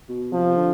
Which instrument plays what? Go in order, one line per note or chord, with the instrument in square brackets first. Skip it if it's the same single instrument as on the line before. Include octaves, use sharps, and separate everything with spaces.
[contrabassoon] B2
[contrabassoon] C3 [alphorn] F3
[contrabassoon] D3